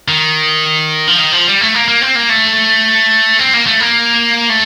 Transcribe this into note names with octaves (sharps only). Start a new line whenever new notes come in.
D#3
F3
D#3
F3
G3
A3
A#3
A#3
C4
A#3
A3
C4
A#3
A3
A#3
A3